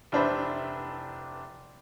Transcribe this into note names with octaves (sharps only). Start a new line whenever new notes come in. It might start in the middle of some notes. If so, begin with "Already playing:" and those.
F1 E3 D4 C5 E5 B5